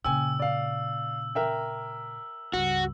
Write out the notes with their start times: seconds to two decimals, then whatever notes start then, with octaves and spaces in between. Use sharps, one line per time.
0.05 A#2 C#3 G5 G#5 E6
0.39 D5 F5
1.35 A#4 E5 G5
2.54 C#2 G2 F#4